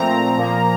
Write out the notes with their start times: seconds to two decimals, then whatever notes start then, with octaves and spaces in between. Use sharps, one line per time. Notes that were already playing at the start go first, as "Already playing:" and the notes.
Already playing: A#2 F3 A3 C4 A#5
0.38 A#2 F3 A#3